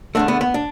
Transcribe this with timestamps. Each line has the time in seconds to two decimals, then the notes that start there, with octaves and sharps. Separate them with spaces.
0.15 E2 D3 A3 D4
0.28 B3
0.41 B3
0.54 D4